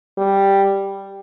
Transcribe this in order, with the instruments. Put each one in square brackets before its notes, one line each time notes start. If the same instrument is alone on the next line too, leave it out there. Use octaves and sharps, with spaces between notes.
[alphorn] G3